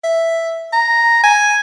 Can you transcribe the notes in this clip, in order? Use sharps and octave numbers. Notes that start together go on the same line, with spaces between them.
E5
A#5
G#5